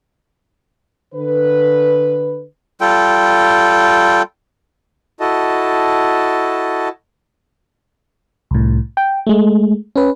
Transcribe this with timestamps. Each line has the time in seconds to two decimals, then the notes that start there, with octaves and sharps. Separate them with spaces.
1.14 D3 B4
2.81 G3 F4 A4 G5
5.20 E4 F#4 A4 D#5 A5
8.51 C2 A2
8.97 G5
9.27 G#3 A3
9.96 C#4 B4